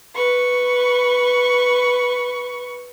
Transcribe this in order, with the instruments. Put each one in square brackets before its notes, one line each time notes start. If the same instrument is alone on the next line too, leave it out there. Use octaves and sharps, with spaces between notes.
[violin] B4 C#6